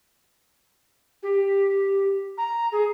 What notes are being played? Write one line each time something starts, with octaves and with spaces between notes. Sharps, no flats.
G4
A#5
G#4